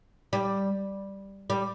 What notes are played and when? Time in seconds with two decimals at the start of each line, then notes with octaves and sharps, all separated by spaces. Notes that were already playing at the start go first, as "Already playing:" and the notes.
0.33 G3
1.50 G3